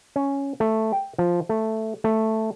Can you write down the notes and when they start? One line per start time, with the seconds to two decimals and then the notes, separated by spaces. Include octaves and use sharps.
0.16 C#4
0.60 A3
0.92 G5
1.18 F3
1.49 A3
2.04 A3